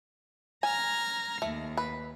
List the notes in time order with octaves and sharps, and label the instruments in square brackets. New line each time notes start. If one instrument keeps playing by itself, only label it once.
[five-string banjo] G#5 [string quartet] A#5 F6 G#6
[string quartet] D#2 [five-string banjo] A3
[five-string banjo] B4